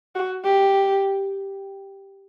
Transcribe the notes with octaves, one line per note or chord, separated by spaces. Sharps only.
F#4
G4